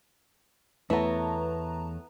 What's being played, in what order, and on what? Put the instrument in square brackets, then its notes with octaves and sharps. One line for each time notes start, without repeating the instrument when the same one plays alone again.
[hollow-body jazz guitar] E2 [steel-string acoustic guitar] A3 C#5 [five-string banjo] B3 E4 [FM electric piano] B4 A5 A#5